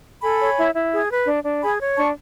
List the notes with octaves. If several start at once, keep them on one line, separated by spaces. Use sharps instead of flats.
A4 G#5 B5
C#5
E4
E4
G#4
B4
D4
D4
G#4 G#5 B5
C#5
D4 A5 C#6